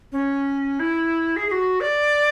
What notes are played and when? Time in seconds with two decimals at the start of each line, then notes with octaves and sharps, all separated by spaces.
0.12 C#4
0.80 E4
1.36 G#4
1.48 G#4
1.51 F#4
1.81 D5